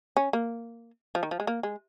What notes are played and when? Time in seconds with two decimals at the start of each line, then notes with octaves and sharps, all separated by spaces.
0.17 C#4
0.33 A#3
1.15 F3
1.23 D#3
1.31 F3
1.40 G#3
1.47 A#3
1.63 G#3